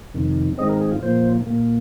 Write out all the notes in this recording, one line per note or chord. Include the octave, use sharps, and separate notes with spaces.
F2 C3 D#3
G#2 D#3 G#3 C4 D#5
A#4
G#4
F4
A#2 F3 A#3 C5
A#2 A#3